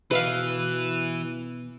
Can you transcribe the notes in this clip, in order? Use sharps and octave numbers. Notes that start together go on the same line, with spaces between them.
B2 E3 B4 E5 F5